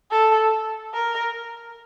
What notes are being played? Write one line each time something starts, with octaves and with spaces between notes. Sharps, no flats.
A4
A#4